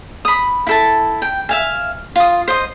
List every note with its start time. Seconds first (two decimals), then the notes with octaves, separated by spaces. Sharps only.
0.25 B5 D#6
0.67 E4 A4 A5
1.22 G5
1.49 E5 F5 G#5
2.16 F4 D#6
2.48 C5 D#5